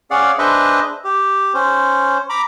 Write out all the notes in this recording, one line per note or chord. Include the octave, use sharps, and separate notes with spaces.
C#4 G#4 D5 F5 F#5
D4 G#4 B4 C5 D#5 E5
G4
C#4 C5
A#5 B5 D6